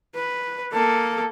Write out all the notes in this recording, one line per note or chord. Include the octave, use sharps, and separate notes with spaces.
B4
A#3 A4